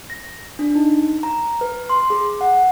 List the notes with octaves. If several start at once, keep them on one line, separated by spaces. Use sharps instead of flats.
A#6
D4
D#4
A#5
B4
C6
G#4
F#5